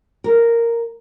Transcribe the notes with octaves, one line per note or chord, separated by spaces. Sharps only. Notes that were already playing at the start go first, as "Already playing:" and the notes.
A#4